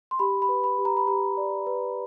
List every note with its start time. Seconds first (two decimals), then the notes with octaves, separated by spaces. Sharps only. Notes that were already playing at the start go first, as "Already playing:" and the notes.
0.11 C6
0.19 G4 B5
0.42 B5
0.49 B4
0.64 B5
0.79 G4
0.85 A#5
0.97 B5
1.07 G4 A#5
1.37 D5
1.67 B4